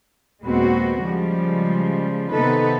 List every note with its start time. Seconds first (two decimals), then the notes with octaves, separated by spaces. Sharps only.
0.43 D#2 A#2 G#3 B3 C4 F#4
1.00 C#3 F3 G3 G#3
2.31 C3 D#3 B3 D#4 A4 B4